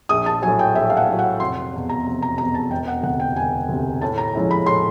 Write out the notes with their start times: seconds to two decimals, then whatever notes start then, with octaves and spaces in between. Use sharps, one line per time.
0.09 A#1 D#6
0.26 A5
0.42 F#3 G#5
0.47 A2
0.59 G5
0.75 A#1 E5
0.90 F5
0.97 F#5
1.08 A2 F#3
1.19 F#5
1.40 F1 C6
1.74 E2 B2
1.89 A#5
2.06 F1
2.22 A#5
2.38 E2 B2 A#5
2.54 A5
2.71 E1 G5
2.88 F#5
3.03 D2 F#5
3.06 C3
3.20 G5
3.36 E1 G#5
3.69 D2 C3
4.01 A2 A5
4.18 A#5
4.35 F3 G#3 C#4 E4
4.51 B5
4.66 A2 C6